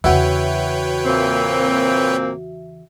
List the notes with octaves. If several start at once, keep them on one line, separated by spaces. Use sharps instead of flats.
E2 C#3 F#4 B4 C#5 E5 G5
A#2 A#3 C4